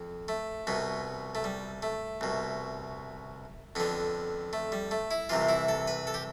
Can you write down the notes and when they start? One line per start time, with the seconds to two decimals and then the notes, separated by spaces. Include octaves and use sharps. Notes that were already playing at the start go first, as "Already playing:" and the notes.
Already playing: F2
0.28 A3
0.67 C2 B2 B3
1.35 A3
1.44 G3
1.82 A3
2.21 C2 B2
3.75 F2 D3 B3
4.53 A3
4.72 G3
4.91 A3
5.11 E4
5.29 C2 C3 E3 F4
5.49 E4
5.68 A4
5.87 B4
6.07 A4
6.14 G4